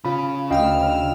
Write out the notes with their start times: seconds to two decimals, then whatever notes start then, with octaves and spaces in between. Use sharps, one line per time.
0.05 C#3 F4 B5
0.51 D2 D#5 F5 G5 E6 F6